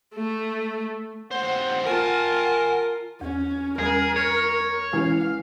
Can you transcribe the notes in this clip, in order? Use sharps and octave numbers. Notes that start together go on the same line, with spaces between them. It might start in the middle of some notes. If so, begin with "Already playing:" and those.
A3
D#2 C5 F#5
F4 A#4 G#5 A5
E2 C#4
E2 G3 C#4 G#4 A#4
C#5
E3 G#3 C#4 F5